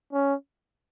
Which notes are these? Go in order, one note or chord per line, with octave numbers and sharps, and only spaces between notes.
C#4